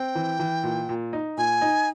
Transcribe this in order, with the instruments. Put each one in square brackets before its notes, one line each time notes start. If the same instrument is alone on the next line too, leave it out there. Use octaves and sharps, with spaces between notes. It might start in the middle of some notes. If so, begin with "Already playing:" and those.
Already playing: [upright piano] C4 [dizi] G5
[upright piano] E3
E3
A#2
A#2
D#4
[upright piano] A#2 [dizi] G#5
[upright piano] D#4